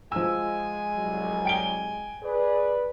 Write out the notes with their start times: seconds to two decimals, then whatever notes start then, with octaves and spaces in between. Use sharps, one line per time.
0.12 F3 G#3 G#5 E6
0.97 C2 F#3
1.45 G5 D7 G7
2.23 G#4 B4 D5